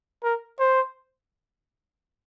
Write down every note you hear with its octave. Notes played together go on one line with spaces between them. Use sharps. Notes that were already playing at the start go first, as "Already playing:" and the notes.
A#4
C5